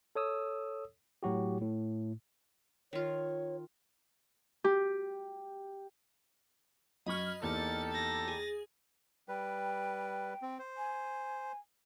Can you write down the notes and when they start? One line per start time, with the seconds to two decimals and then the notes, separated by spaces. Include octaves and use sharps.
0.15 A4 C#5 D#6 E6
1.23 A2 F#3 F#4 G4
1.61 A2
2.93 D#3 F4 C#5
4.64 G4
7.06 F#2 F#3 D#5 B5 C#6 F6 G#6
7.43 E2 A#3 D#4 G4 A4 A6 C#7
7.92 A6 A#6
8.28 G#4
9.28 G3 B4 G5
10.42 C4
10.59 C5
10.77 G#5